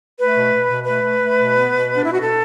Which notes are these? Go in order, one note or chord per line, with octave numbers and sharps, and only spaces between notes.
A3 B4
B2
B2
B2
A3 B4
A3
A3
B2
B3
B2
B3
D4
B2 E4
F#4
B2 A4